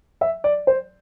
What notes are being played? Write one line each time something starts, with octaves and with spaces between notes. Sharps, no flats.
E5
D5
C5